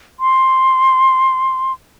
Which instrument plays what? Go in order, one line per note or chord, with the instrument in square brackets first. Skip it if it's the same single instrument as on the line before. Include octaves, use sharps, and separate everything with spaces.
[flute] C6